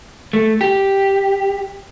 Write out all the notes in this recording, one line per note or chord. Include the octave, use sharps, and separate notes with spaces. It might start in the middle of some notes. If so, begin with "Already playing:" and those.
A3
G4